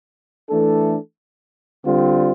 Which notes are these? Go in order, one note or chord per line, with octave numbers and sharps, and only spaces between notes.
E3 A3 D4 A4
D3 G3 C4 F4